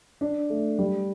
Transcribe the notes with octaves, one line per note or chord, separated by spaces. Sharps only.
D4
A3
G3